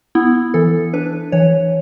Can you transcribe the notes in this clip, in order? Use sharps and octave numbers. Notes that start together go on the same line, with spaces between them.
B3 E4
E3 A4
D4 B4
E3 C#5